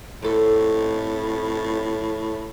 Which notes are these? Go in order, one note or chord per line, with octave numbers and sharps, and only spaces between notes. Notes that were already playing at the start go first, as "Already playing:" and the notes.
F2 A2 A4